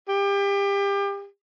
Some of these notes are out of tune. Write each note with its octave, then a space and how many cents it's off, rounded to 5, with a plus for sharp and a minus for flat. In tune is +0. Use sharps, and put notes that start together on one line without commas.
G4 +30